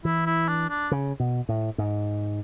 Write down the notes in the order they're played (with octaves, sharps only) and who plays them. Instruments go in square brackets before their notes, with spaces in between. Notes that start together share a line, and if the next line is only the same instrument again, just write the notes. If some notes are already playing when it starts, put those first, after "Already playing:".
[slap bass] E3 [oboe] E4
[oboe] E4
D4
D4
[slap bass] C#3
B2
A2
G#2